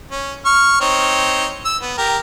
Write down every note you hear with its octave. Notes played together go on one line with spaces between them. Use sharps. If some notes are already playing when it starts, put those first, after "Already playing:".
C#4
C#6 F6
C4 D#4 C#5
E6
B3
G4 A#4